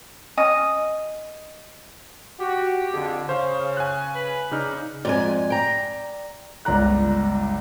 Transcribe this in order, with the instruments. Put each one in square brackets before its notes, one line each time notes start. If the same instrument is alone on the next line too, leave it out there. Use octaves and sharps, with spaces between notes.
[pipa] C#4 D#5
[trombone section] F#4 [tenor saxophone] G4
[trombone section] F2 D3 [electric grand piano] G#4
[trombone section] C#3 [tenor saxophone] C#4 [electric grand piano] C5 F5
[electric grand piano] G#5 F#6
[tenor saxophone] B4
[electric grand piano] C#3 D#4 F6 [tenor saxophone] D4
[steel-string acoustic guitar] F2 G#2 G#5 [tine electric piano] D5
[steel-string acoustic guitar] G5 A#5
[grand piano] G1 C#2 D5 A#5 F#6